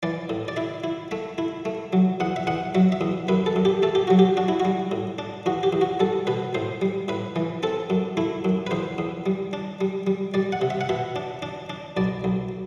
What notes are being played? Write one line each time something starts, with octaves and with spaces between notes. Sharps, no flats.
E3 D5
A2
D5
E4 E5
E4
A3 E5
E4
A3
F#3
E2 F#5
E5
E2 F#5
F#3 E5
E5
E2
F#2 B4
A4
F#2
G4
A3 A4
G4
F#3 F#4
G4
D4 F#4
E4
F#4
G3
A2
D4
E2 F#4
G4
E2
F#4
G3 A4
B2 B4
A2 C5
G3
A2 B4
E3
C4 A4
F#2
A3 E4
F#2
B4
E2 C5
E2
G3
D4
G3
G3
G3 D5
F#5
C3
E5
F#5
B2 E5
D4
D4
D4
B1 D5
B1